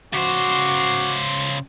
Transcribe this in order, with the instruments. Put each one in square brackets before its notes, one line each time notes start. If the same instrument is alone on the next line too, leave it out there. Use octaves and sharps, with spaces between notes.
[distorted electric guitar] C#3 C5 [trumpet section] F#4 D6